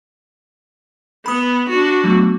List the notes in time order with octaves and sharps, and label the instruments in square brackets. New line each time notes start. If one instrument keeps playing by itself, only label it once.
[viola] B3 [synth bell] B5 D#6
[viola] D4 F#4
[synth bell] F#3 A3 B3